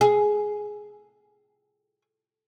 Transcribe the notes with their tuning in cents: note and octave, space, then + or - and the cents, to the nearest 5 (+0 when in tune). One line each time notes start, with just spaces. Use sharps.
G#4 +10